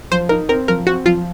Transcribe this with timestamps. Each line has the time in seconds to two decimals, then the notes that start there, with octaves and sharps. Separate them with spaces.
0.11 F3 C5
0.29 D#4 A#4
0.49 C4 A#4
0.68 F3 A#4
0.87 C4 F#4
1.06 F3 F4